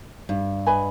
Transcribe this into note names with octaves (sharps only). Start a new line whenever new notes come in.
G2
B4 D#5 G#5 B5